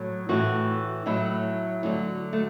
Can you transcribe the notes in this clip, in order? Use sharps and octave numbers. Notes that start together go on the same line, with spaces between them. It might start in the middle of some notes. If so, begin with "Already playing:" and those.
Already playing: A2 F#3
A2 E3 F#4
A2 F#3 E4
D2 D3 F#3
A3